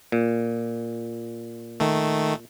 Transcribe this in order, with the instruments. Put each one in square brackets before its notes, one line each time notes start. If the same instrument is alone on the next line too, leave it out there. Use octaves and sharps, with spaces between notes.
[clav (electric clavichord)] A#2
[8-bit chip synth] D#3 A3